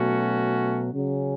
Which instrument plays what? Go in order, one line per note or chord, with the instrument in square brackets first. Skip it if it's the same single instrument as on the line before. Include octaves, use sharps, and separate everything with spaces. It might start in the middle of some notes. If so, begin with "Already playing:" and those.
Already playing: [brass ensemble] B2 F#3 A3 C#4 F#4
C#3 F#3 C#4